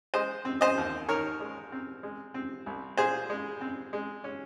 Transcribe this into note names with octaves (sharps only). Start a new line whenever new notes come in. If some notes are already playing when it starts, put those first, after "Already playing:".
G#3 C5 D#5
C4
C5 D#5
D#2
D#3 A#4 C#5
G#3
C4
G#3
C4
C2
A#2 G#4 C5
G#3
C4
G#3
C#4